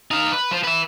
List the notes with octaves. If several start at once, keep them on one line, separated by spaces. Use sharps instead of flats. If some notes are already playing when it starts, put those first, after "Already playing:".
D#4 F5
B4
F3 C5
B4 E5